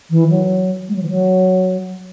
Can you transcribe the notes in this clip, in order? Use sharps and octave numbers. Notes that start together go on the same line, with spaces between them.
E3
F#3
G#3
F#3
E3
F#3